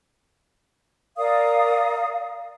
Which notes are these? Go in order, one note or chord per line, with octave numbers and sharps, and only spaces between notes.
A#4 D5 F5 D#6